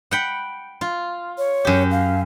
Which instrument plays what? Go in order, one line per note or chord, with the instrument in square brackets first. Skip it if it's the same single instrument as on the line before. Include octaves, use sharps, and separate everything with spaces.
[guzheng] F#5 G5 B5
F4
[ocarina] C#5
[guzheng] F#2 G4
[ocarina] F5